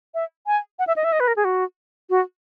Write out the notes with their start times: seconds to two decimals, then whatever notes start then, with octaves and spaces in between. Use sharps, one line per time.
0.14 E5
0.47 G#5
0.79 F#5
0.87 E5
0.96 D#5
1.04 E5
1.12 D#5
1.20 B4
1.28 A#4
1.36 G#4
1.45 F#4
2.10 F#4